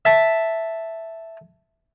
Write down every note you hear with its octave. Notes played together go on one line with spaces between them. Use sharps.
E5 A5